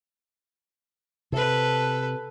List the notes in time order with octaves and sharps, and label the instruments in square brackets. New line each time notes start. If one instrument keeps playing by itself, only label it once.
[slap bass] C3 [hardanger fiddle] A4 B4